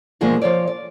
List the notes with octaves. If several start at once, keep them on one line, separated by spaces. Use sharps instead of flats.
B2 D3 F3 G#3 A#3
F3 F4 C#5 D5
D5